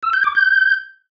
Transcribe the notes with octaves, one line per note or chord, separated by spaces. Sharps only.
E6
G6
D6
G6